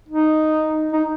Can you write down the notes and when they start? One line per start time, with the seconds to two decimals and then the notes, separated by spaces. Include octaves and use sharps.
0.09 D#4
0.93 D#4